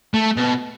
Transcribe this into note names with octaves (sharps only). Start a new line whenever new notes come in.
A3
B2